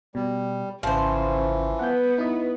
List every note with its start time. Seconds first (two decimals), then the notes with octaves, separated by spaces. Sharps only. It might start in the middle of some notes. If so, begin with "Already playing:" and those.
0.15 B2 G3
0.83 G#1 C#3 E3 F3 C#4 C5
1.79 B3 B4 F#5 G6
2.18 D#4 E4 D#5